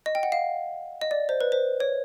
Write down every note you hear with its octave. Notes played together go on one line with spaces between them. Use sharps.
D#5
G5
F#5
F5
D#5
D5
C5
B4
C5
C#5